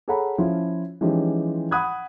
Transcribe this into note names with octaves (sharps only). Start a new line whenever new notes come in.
G#4 A4 C#5 F#5 A#5 B5
F3 C#4 E4 F4
E3 F3 G#3 C#4 D#4 G4
F#5 B5 D#6 F#6 G#6